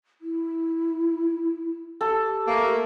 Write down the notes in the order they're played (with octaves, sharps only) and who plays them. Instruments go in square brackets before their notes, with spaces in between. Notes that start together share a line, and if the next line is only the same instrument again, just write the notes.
[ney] E4
[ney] G4 [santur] A4
[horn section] A3 A#3